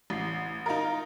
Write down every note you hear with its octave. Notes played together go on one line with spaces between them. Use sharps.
A1 C7
D#4 F4 A#4